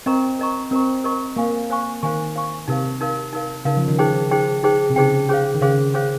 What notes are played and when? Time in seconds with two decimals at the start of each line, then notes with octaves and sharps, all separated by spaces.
0.06 C4 A#4 D#5 A#5 C#6
0.39 A#4 D#5 A#5 C#6
0.71 C4 A#4 D#5 A#5 C#6
1.04 A#4 D#5 A#5 C#6
1.36 A#3 C5 F5 G#5 C#6
1.70 C5 F5 G#5 C#6
2.03 D#3 C5 F5 G#5 C#6
2.35 C5 F5 G#5 C#6
2.68 C3 D#4 A#4 F5
3.01 D#4 A#4 F5
3.33 D#4 A#4 F5
3.65 C#3 D#4 A#4 F5
3.77 F3
3.88 D#3
3.99 D#4 G#4 C5 G5
4.31 D#4 G#4 C5 G5
4.63 D#4 G#4 C5 G5
4.90 C3
4.96 C#3 D#4 G#4 C5 G5
5.29 C#4 G#4 C5 F5
5.54 D#3
5.61 C#3 C#4 G#4 C5 F5
5.94 C#4 G#4 C5 F5